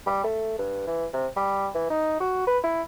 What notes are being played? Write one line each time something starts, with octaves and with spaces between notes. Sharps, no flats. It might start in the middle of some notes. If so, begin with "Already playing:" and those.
G3
A3
G2
E3
C3
G3
E3
D#4
F#4
B4
E4